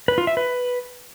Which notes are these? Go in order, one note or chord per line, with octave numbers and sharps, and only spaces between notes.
B4
F4
E5
B4